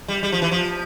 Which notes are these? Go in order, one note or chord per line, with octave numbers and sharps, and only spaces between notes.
G3
G3
F3
E3
F3